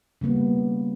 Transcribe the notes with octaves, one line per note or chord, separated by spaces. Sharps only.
C#3 G3 A#3 B3